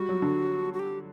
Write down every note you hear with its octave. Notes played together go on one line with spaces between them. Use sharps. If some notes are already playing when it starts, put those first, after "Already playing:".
Already playing: G3 F#4
F#3
D3
F#4
G4